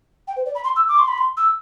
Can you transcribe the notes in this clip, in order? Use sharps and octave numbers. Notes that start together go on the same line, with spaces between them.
G5
C5
D5
B5
C6
E6
D6
C6
B5
C6
E6